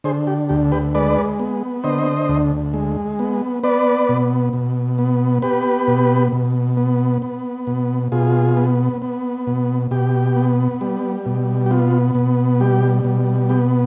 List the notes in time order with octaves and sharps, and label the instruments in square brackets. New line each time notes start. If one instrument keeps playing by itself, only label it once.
[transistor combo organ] D3 G#4 C5
G4
D2 G4
G4 B4
G#3 B4 D5
B3
D3 C5 D#5
D2
G#3
B3
B3 B4 D5
B2
B2
B3
B3 G4 B4
B2
B2
B3
B3
B2
B2 F4 G#4
B3
B3
B2
B2 G4
B3
G3
B2
G4
B3 F4
B2
G3 G4
B2
B3 G4